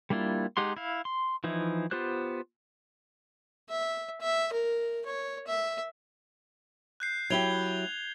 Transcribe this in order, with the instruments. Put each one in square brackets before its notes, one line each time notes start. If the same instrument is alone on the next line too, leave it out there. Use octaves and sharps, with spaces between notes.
[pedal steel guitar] G3 A#3 D4 E4 F4
G#3 D#4 G4 F#5 C6
E4 F5
C6
E3 F3 D#4 E4
B3 F4 G4 C5 F#6
[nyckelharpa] E5
E5
A#4
C#5
E5
[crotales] F#6 G6 C7
[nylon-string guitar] F#3 E4 G4 [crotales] G#6 F7 G7